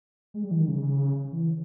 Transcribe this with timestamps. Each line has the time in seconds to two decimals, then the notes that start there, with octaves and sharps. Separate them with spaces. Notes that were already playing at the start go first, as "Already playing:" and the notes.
0.34 G#3
0.44 G3
0.51 E3
0.59 D#3
0.68 C#3
1.32 E3